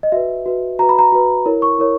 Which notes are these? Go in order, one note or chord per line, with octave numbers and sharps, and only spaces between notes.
D#5
F#4 B4 E5
F#4 B4
F#4 B4 A#5
B5
A#5
F#4 B4
E4 A#4 C#5
C#6
E4 A#4 C#5